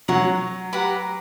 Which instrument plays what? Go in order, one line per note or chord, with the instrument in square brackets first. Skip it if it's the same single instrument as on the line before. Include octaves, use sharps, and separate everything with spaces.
[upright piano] F#3 [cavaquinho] C#5 F#5 A#5
[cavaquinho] G4 B4 F#5 A#5